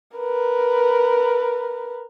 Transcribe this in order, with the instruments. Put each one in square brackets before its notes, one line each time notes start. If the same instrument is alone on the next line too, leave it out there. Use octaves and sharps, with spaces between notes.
[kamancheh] A#4 B4